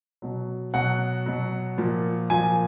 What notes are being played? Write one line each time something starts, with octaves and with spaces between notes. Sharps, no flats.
B2 F#3
B2 F#3 F#5
B2 F#3
A#2 F3
A#2 F3 G#5